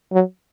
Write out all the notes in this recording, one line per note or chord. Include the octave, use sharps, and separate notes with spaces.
F#3